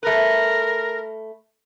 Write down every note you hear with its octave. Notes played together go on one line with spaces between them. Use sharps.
A3 A#4 B4